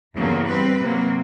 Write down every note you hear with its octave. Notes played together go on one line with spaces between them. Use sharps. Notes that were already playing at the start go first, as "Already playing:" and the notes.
E2 G2 C#3 F#3 A#3
G3 C4 B4
C3 F#3 A#3